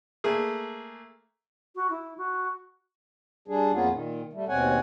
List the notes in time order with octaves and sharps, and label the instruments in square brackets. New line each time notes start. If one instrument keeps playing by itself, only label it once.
[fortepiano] A3 A#3 G#4
[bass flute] F#4
E4
F#4
[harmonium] G3 D4 G#4
F2 A#3 B3 C#4 F4 G#4
A#2 D#3
G3 A3
D#2 B2 C4 C#5 F#5 G#5